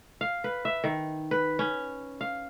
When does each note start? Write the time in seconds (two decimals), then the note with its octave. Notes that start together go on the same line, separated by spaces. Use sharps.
0.21 F5
0.44 B4
0.65 E5
0.84 D#3
1.31 B4
1.59 C#4
2.21 F5